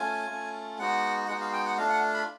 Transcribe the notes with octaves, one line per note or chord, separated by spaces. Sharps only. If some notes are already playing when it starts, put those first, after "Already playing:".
Already playing: A3 C#4 F4 G#5
A3 C#4 F4
G#3 B3 D#4 F#4 F#5
G#3 B3 D#4 F#4 F#5
F5
G5
F#5
A3 D4 F4 F5
F#5
B5